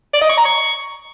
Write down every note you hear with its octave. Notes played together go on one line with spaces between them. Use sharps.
D5
D#5
C#6
A#5
C#6